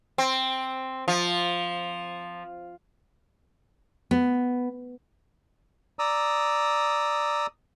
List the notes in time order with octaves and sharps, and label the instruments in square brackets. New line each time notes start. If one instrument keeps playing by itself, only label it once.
[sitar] C4
F3
[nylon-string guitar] B3
[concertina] D5 A#5 D#6 E6